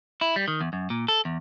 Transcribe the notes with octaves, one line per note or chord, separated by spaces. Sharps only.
E4
G3
D#3
E2
F#2
A#2
A4
E2